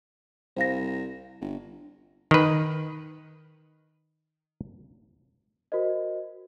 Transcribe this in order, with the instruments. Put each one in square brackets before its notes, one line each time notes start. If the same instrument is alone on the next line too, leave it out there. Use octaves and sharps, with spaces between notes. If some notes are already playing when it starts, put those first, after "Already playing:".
[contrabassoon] C2 [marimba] C5 F5 A#6
[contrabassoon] G1
[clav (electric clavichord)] D#3 B4
[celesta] F#4 A#4 C5 D#5